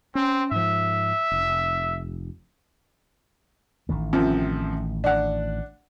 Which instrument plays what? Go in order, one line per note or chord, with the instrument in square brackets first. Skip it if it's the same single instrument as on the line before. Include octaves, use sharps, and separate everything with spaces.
[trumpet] C4 [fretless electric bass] C#4
[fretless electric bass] G#2 F3 [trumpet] E5
[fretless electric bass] F1
[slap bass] A1 D#3 A3
[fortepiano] F#2 C3 F3
D4 F#5